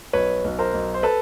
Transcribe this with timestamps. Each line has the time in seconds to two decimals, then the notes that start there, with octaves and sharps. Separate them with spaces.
0.13 B1 B4 C#5
0.44 B1
0.59 A#4 C5
0.74 B1
0.94 C5
1.03 A4 B4